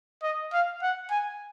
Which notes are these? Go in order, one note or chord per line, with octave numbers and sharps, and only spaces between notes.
D#5
F5
F#5
G#5